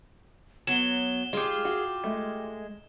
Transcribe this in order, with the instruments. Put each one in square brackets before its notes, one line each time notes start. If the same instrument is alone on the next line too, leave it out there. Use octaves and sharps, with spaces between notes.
[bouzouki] F#3 [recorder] B3 [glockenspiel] E7 G7
[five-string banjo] G#3 [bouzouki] F4 G4 [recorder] G#4
[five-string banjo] F#4
[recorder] G#3 [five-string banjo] A3